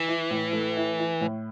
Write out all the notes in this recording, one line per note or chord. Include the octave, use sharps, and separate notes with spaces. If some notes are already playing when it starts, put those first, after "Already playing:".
Already playing: E3
E4
A2
A3
E4
E4
A2